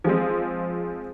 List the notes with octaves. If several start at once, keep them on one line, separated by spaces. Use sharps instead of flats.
F3 G#3 C4